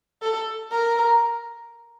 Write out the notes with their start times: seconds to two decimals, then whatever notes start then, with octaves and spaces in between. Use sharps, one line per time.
0.22 A4
0.72 A#4